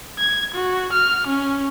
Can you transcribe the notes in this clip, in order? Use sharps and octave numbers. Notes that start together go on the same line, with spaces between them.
G#6
F#4
F6
C#4